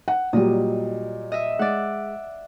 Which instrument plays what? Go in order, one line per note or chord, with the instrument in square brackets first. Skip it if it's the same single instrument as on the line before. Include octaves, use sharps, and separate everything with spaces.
[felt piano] F#5
[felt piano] A#2 F#3 G3 [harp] D#5
[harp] D#5 E5
[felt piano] G#3 [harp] D5 F#5